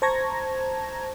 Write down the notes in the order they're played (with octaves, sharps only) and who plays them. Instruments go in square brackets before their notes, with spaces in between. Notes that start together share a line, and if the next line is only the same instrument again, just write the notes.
[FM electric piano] C5 A5 A#5 C#6 G#6 A#6